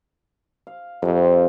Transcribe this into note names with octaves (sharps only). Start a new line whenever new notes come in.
F5
F2 C3 F3